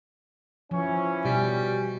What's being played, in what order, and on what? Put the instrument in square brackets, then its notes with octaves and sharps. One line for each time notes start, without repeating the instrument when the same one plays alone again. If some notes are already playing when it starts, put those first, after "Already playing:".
[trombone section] E3 C#4 [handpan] F3
[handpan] B2 [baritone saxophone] G3